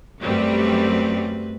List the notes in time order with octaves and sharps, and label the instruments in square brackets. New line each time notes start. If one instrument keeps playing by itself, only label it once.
[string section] F#2 F#3 G3 [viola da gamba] A3 C4 B4